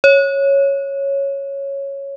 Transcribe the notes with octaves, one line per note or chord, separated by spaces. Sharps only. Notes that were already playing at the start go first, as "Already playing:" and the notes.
C#5